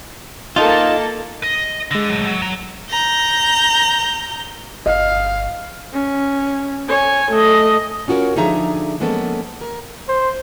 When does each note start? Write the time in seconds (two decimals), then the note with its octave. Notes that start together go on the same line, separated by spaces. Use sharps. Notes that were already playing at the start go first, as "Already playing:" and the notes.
0.56 A#3 D#4 F4 A4 A5
1.43 D#5
1.91 D3 G#3 A#6
2.10 F#3 A3
2.26 F#3
2.42 F#3 A#5
2.91 A#5 G6
4.86 G1 D#5 F5
5.94 C#4
6.89 C#5 G#5
7.32 A3 D#5
8.08 C#4 F4 F#4 A4 A#4 C#5
8.36 D3 F3 D#4 G#4 E5 A#5
9.00 F3 G#3 A#3 B3 C#4 A4
9.61 A#4
10.08 C5